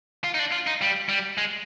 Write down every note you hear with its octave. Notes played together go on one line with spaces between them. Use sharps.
F4
D#4
D4
F4
D#4
G3
G3
G#3